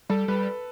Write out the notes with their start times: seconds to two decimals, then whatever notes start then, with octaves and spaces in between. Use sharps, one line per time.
0.10 G3 A4
0.28 G3 B4